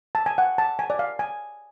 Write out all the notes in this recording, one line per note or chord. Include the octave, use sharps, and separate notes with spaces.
A5
G#5
F#5
A5
G#5
D5
F5
G#5